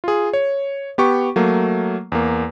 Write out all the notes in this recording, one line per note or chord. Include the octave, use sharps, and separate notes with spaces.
F4 G#4
C#5
B3 G4 C#6
F#3 A3 A#3
E2 A#3